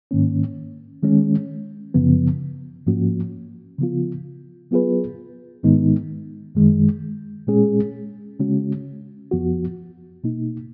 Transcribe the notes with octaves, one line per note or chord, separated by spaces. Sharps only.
G#2 D#3 A#3 C#4
D#3 G#3 C#4
F#2 C#3 F3 B3
G#2 F3 A#3 C#4 F#4
C#3 F3 B3 F4
F#3 B3 F4 G#4 B4
G#2 D#3 G#3 B3 D#4
F#2 D#3 G#3
A#2 G#3 C#4 G#4
C#3 G#3 C#4 F#4
F2 F3 B3 F#4
B2 A#3 D#4